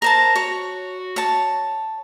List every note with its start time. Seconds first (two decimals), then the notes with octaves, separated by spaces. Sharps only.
0.02 A#4 C5 A5 A#5
0.35 F#4 C#5
1.16 C#5 A5